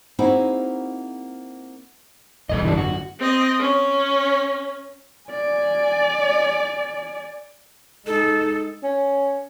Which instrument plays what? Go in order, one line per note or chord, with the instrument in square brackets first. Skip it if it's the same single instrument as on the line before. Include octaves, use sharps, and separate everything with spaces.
[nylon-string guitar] A#3 C4 D#4 E4 F#4 G#4
[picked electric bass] D#1 B1 E2 [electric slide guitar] G2 A4 D#5
[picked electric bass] G#1 F#2 D3 [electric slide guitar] E3 G3 D4
[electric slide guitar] F#4
[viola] C4 D#5
C#4
[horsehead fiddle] D5 G#5
[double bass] G#3 D#4 [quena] A4
[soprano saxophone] C#4